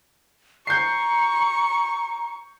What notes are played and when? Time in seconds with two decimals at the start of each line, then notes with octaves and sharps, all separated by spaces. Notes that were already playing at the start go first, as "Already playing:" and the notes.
0.67 A#5 C#6 G6 C7